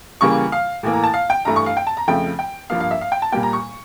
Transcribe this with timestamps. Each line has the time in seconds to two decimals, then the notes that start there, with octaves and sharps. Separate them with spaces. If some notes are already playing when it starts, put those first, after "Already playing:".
0.21 C#3 E3 G3 A#3 C#6
0.52 F5
0.83 A2 E3 A#3
0.93 A#5
1.03 A5
1.14 F5
1.30 G5
1.45 G2 E3 A3 A#5
1.56 C#6
1.66 F5
1.77 G5
1.87 A5
1.97 A#5
2.08 F2 C#3 F3 A3 G5
2.39 G5
2.70 G2 F3 A#3 F5
2.80 F5
2.91 E5
3.01 F5
3.12 G5
3.22 A5
3.32 A#2 G3 A#3 G5
3.43 A#5
3.53 C#6